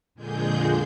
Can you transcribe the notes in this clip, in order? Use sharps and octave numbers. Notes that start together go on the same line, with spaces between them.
F2 A#2 D3 G#3 G#4 G6